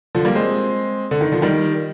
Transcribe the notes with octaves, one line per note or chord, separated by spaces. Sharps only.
D3 F3
G3 A#3
G#3 C4
D3
D#3
D3 F3
D#3 G3